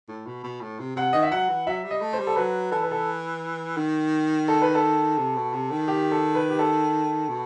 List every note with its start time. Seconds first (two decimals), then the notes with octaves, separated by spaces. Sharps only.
0.08 A2
0.26 B2
0.44 B2
0.61 A2
0.79 C3
0.96 C3 F#5
1.13 D#3 D#5
1.22 E5
1.31 F#3 F#5
1.49 E3
1.67 F#3 E5
1.84 G3
1.91 D#5
2.01 A3
2.13 C5
2.19 G3
2.27 A4
2.36 F#3 B4
2.71 E3 A4
2.82 B4
2.91 A4
3.77 D#3
4.48 A4
4.62 B4
4.75 A4
5.18 C3
5.36 B2
5.53 C3
5.71 D#3
5.88 G4
6.11 A4
6.35 B4
6.50 G4
6.59 A4
7.29 B2